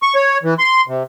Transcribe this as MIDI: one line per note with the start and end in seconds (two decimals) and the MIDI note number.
0.02 0.15 85
0.15 0.38 73
0.43 0.54 52
0.59 0.81 84
0.88 1.03 48